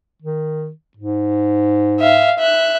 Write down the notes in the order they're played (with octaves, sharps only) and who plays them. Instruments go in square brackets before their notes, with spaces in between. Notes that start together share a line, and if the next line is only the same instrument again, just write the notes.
[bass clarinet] D#3
G#2
[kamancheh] E5 F5
E5 F#6